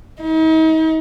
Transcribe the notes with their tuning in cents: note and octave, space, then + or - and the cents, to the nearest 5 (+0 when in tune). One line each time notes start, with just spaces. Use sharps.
D#4 +40